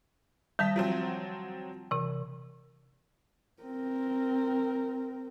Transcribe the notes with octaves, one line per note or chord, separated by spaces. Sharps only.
D#3 G3 D#5 A5 B6
F3 F#3 C4
C3 E3
C4 A#4